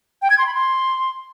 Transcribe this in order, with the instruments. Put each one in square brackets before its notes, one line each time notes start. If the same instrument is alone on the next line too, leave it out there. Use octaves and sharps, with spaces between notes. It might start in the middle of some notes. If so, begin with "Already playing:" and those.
[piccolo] G5
G#6
C6
B5
C6